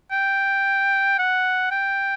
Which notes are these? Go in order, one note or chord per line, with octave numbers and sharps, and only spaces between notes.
G5
F#5
G5